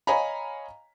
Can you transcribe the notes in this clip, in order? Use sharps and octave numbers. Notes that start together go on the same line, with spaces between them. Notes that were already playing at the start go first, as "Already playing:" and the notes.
C#5 D#5 F5 G#5 A#5 B5